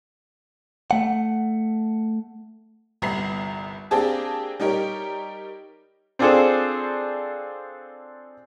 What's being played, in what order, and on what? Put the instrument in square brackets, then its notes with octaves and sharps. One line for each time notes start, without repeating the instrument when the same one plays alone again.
[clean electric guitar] A3 F#5
[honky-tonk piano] G1 C2 B3 A#5 B5 C7
A#3 C4 D4 G4 G#4 A5
G3 D#4 G4 A#4 C#5
[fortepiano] C4 D4 F4 G#4 A4 C5